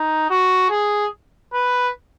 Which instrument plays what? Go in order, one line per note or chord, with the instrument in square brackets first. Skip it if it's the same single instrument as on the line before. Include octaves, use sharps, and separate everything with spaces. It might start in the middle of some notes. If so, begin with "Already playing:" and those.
Already playing: [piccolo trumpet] D#4
F#4
G#4
B4